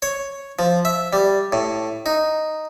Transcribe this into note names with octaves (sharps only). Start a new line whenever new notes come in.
C#5
F3
E5
G3
A2
D#4